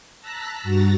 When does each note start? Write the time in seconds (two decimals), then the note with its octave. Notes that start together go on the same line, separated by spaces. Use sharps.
0.20 A5 A#5 E6 F#6 A#6 B6
0.63 G2 F#4 A#5 A6 A#6